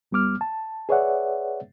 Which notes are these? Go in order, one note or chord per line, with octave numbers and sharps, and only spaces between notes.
D2 G3 B3 D6 F6
A5
G#4 B4 C#5 D5 E5 F#5